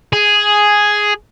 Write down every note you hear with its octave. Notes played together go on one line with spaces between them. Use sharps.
G#4